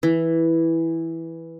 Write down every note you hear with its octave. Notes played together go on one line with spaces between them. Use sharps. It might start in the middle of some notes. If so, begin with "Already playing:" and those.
E3